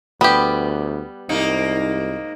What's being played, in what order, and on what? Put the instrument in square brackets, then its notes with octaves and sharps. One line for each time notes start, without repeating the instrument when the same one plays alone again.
[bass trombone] D2 [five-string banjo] G3 G4 [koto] B3
[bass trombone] C2 [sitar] G#2 A#3 D#4